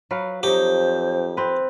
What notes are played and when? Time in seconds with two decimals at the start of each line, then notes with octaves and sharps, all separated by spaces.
0.11 F#3 B4 F5
0.43 F2 F#3 D#4 G4 C5
1.37 C4 B4